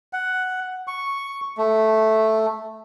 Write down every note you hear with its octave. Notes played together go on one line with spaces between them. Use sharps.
F#5
C#6
A3